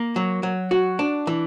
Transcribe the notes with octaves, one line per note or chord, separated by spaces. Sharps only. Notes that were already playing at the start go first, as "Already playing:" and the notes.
Already playing: A#3
F#3
F#3
F#4
D4
E3